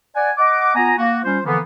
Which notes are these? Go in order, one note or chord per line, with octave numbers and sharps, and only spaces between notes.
D5 F#5 G#5
D#5 F#5 D6
B3 F4 G#5 A#5
A#3 F#4
G3 C#4 F4 C5
D3 E3 F3 A#3 B3